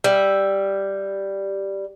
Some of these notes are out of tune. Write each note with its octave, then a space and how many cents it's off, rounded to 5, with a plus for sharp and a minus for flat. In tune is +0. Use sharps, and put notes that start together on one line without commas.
G3 +0 E5 +0